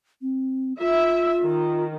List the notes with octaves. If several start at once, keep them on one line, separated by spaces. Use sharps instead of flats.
C4
F4 E5
D#3